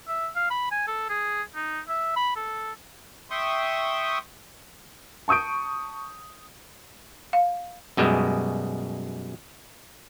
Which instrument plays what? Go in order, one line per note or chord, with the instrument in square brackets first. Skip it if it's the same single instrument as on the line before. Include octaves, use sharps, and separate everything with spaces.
[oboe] E5
F5
B5
G#5
A4
G#4
D#4
E5
B5
A4
[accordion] E5 G5 C6 C#6 D#6
[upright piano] A5 C#6 D#6 G6 D7
[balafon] F5
[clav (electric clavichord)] F#2 B2 G3 G#3